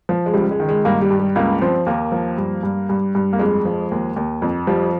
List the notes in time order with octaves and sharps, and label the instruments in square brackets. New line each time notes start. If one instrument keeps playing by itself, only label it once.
[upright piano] F3
G#3
C#2 G3
G#3
D#3
G#3
G2 A#3
G3
G2
G3
C#2 A#3
F3 C4
D#2 A#3
F3
G2
G2
G2
G2
A#3
F2 G#3
F3
D#2
D#2
F2
F3 G3